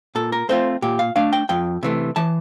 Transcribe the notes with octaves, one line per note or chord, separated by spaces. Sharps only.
A#2 A4
A#4
A3 C4 F4 C5
A#2 G4
F5
A3 D4 F5
G5
F2 G5
C3 E3 A3
E3 A5